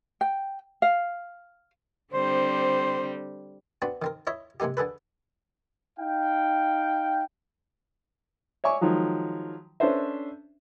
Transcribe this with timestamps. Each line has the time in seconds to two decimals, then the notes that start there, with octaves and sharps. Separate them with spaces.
0.21 G5
0.82 F5
2.14 D3 G3 C4 C5
3.82 B3 C4 D4 F#4
4.02 D#3 C4 A#4
4.27 E4 C#5 D#5 E5
4.60 C3 G#3 A#3 D#4 G4
4.77 D3 G#4 A4 B4
5.97 D#4 F5 G5
8.64 C#5 E5 G#5 C#6 D6
8.81 D#3 F3 F#3 G#3
9.80 C#4 D4 A4 B4 C5 E5